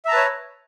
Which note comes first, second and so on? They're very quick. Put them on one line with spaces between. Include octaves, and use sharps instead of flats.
E5 A#5 A5 B4 C#5